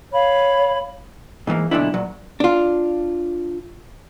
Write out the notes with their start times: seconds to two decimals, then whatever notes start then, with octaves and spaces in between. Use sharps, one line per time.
0.13 C#5 F5 B5
1.47 G#2 E3 A3 A#3
1.71 B1 F#2 A#2 D3 D4 E4
1.94 A#2 F#3
2.40 D4 F4